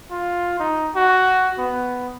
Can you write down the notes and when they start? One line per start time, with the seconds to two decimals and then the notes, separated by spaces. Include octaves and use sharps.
0.11 F4
0.60 D#4
0.96 F#4
1.58 B3